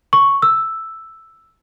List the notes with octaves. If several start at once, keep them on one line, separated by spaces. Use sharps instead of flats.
C#6
E6